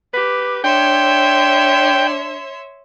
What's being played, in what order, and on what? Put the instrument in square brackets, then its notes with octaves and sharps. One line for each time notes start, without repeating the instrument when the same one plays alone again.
[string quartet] G4 [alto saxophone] B4
[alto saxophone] D4 [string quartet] C#5 E5 C6 [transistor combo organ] G5